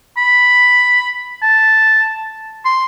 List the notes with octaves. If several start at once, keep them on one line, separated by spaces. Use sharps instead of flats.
B5
A5
C6